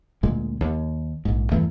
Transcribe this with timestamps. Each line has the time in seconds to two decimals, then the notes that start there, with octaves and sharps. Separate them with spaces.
0.23 D2 A#2 G#3
0.61 D#2
1.25 A#1 G#2
1.52 E2 G2 E3 A3